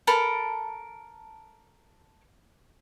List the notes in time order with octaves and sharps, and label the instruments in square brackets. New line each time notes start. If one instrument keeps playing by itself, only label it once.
[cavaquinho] A4 A#4 A5 B5